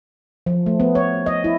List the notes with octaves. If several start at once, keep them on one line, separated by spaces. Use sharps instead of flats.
F3
A3
B3
C#5
D#5
E4